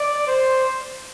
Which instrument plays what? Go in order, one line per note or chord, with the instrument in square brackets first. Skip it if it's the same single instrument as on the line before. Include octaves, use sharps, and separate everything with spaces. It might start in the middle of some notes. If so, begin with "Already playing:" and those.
Already playing: [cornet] D5
C5